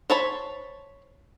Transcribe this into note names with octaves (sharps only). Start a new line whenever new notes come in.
C5 C#5 A5 B5